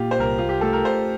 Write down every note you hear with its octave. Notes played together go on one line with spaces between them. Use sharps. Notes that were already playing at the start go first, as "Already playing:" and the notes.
Already playing: A#2 F4 G4
C5
C2 A#4
F4
G4
A3 A4
A#4
C5